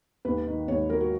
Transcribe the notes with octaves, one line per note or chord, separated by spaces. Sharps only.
D#2 B4
D#3
D#2 C#5
F#3 A#4
F#4